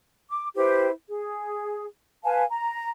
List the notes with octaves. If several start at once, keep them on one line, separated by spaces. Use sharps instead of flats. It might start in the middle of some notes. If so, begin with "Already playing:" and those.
D6
E4 G4 B4 C5
G#4
B4 F5 G#5 A5
A#5